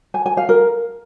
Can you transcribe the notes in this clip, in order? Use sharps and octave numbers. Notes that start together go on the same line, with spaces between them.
G#5
G#5
F5
A#4